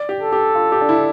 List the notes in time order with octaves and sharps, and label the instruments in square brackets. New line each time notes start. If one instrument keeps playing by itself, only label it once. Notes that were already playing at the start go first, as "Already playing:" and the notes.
Already playing: [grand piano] D5
G4
[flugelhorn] A4
[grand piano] G4
F4
G4
D4
E4